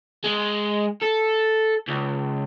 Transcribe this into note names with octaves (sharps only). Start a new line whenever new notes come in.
G#3
A4
C#2